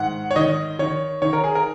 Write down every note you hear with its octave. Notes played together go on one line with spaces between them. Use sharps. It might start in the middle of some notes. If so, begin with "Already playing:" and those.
Already playing: G#2 D#3 F#5
C#5
D#3 D#5
D#3 C#5
D#3 C#5
A#4
G#4
A#4